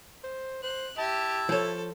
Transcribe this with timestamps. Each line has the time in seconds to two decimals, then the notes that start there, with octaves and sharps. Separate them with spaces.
0.24 C5
0.63 C5 F#6
0.98 E4 G4 E5 A5
1.49 F3 A4 C#5